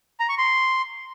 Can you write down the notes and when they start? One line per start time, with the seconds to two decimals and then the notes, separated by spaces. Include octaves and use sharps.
0.20 A#5
0.29 C#6
0.38 C6